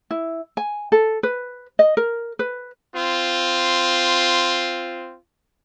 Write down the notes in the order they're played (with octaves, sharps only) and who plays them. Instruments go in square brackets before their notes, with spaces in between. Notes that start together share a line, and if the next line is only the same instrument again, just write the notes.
[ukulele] E4
G#5
A4
B4
D#5
A#4
B4
[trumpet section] C4 F4